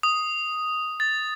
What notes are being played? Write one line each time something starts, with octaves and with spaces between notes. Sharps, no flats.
D#6
A6